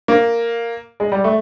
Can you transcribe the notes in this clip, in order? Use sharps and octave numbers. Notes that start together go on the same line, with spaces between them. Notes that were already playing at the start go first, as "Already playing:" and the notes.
A#3
G#3
G3
A3